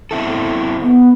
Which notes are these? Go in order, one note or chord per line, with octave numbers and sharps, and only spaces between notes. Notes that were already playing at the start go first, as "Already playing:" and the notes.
C4 E4 A4
B3